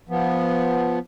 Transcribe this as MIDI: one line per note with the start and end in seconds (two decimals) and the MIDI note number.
0.09 0.99 53
0.09 0.99 59